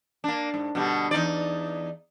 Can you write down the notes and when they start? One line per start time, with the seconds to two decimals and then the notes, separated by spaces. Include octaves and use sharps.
0.24 A#3 D4
0.54 G#2
0.75 B2 D3 G3
1.11 E2 D#4 D5